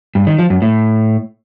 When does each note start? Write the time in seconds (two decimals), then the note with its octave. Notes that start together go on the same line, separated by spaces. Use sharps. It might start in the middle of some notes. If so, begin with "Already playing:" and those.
0.15 G2
0.27 D#3
0.39 F3
0.50 F#2
0.62 A2